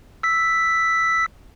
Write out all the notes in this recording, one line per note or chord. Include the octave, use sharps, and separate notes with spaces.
E6 B6